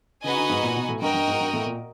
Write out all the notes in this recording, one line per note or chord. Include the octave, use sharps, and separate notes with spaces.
C#3 D#4 F#4 B4 D#5 G#5
D3
G#2
A#2
B2
A2
G2 F#4 A#4 D#5 G5
G2
G#2
G2
A2
A#2